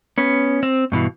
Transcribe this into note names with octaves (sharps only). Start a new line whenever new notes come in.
B3 C#4
C4
G2 B2 E3